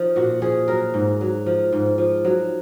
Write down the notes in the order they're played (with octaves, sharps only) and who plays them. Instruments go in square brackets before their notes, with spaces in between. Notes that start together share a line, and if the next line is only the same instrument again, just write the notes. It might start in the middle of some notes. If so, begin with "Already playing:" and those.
Already playing: [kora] F3 D#4
A#2 F#4
F3 G#4
F#3 A#4
G#2
F#3
F3
G#2
F3
F#3